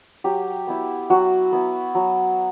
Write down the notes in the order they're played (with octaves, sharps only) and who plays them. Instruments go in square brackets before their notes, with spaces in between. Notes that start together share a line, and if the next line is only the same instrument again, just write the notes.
[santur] F#3 G4
B3 E4
F#3 F#4
B3 E4
F#3